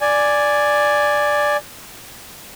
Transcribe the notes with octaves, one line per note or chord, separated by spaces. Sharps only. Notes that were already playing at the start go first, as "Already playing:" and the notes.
D5 G#5